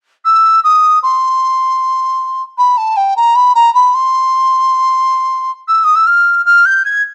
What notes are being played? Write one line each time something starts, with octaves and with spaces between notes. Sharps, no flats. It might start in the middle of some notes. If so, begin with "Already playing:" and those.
E6
D#6
C6
B5
A5
G5
A#5
B5
A#5
B5
C6
E6
D#6
E6
F6
F6
G6
G#6